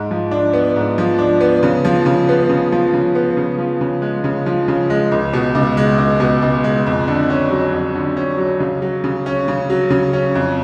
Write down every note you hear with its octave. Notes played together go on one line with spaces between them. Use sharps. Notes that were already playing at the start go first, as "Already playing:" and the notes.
Already playing: G#2
F3
D4
B3
G#2
F3
D4
B3
C#3
F3
C#3
B3
C#3
F3
C#3
B3
C#3
F3
C#3
G#3
C#3
F3
C#3
G#3
C#2
B2
C#2
G#3
C#2
B2
C#2
G#3
F2
D3
C#4
F#3
F2
D3
C#4
F#3
C#3
F#3
C#3
C#4
C#3
F#3
C#3
C#4
F2